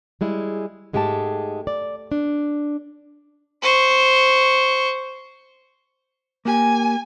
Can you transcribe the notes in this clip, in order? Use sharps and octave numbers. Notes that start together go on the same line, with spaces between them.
G3 G#3 E4 G#4
G#2 G#3 A3 G4 G5 A5
D5
D4
C5 C#6
A#3 G4 G#5